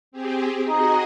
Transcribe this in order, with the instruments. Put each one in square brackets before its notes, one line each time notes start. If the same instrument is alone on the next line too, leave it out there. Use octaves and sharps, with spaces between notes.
[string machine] C4 G4 G#4
[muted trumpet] D#4 [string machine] F#4 G#4 D#5